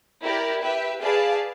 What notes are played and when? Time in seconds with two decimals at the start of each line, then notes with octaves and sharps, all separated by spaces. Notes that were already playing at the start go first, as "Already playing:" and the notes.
0.22 E4 G4 A#4 D5
0.61 G4 B4 E5
1.01 G#4 B4 D5 F5 A5